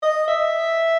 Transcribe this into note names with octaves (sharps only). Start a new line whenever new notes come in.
D#5
E5